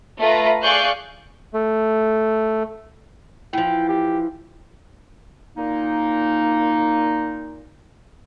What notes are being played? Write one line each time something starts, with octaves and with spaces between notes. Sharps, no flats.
A3 F4 B4 A#5
G#4 D5 F5 C#6 F#6 G6
A3
E3 F3 G5
G4
A#2 A#3 D#4